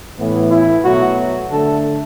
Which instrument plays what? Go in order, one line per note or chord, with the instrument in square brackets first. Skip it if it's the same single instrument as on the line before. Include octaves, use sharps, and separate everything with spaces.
[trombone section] A2 E3 B3
E4
B2 F#3 A3 F#4
D3 A3 A4